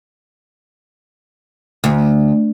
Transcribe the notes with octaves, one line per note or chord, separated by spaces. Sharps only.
D2